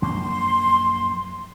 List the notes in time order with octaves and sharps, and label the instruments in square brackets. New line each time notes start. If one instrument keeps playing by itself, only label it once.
[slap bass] A#1 F#2 A#3 [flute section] C6